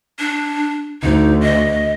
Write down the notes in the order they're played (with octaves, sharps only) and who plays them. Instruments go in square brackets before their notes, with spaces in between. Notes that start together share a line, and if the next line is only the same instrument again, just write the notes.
[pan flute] D4
[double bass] D2 [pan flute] D#4
[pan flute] D#5